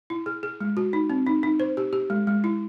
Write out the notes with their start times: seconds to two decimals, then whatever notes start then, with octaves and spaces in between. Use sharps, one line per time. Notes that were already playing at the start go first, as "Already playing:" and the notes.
0.10 E4
0.26 G#4
0.43 G#4
0.61 G#3
0.77 F#4
0.93 D#4
1.10 C4
1.27 D#4
1.43 D#4
1.60 C5
1.77 G4
1.93 G4
2.10 G#3
2.27 G#3
2.44 E4